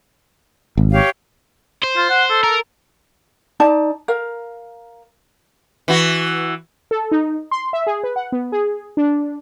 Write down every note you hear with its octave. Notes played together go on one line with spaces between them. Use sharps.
G#1
G4 C#5 F5
C5
F4
F#5
A4
A#4
D#4 D5 A5
A#4 F5
E3 F#4
A4
D#4
C6
E5
G#4
B4
F#5
B3
G#4
D4